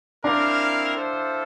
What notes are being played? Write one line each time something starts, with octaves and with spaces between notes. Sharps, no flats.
C4 D4 E4 A#4 F5
E4 A4 C5 F5